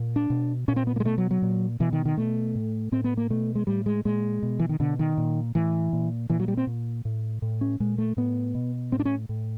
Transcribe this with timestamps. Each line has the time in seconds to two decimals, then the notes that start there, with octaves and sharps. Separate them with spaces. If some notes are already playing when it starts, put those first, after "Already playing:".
Already playing: A#2
0.16 D4
0.30 B2
0.68 A#2 C#4
0.76 C4
0.87 B3
0.96 A#3
1.00 G#3
1.05 B2 A3
1.18 F#3
1.31 F#3
1.42 A#2
1.80 B2 E3
1.93 D#3
2.05 D#3
2.17 B2 A3
2.55 A2
2.92 A2 C4
3.04 B3
3.17 A#3
3.30 B2 A3
3.55 G#3
3.67 A2 G3
3.86 G#3
4.05 A#2 G#3
4.43 B2
4.59 E3
4.69 D#3
4.80 B2 D3
4.99 D#3
5.18 A#2
5.55 A2 E3
5.93 A#2
6.30 A#2 E3
6.40 F#3
6.48 G3
6.57 C4
6.67 A#2
7.05 A2
7.42 A2
7.61 C#4
7.80 A#2 G#3
7.98 A3
8.17 A2 B3
8.55 B2
8.92 A2 C4
9.00 D4
9.05 C#4
9.29 A2